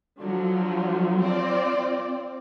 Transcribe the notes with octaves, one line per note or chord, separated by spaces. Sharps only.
D3 F3 F#3
C4 F4 D5